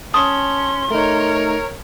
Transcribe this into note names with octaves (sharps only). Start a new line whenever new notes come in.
C#4 A5 C6 D#6
A3 D#4 A#4 C#5